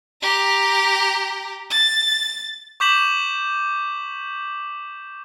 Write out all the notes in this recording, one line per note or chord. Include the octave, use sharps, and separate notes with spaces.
G4 A#5
A6
C#6 D6 G6 B6 E7 F#7